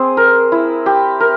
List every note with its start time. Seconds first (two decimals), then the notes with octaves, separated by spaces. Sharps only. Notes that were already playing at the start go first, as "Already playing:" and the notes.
Already playing: C4 G#4
0.17 A#4
0.52 E4
0.86 G4
1.20 A#4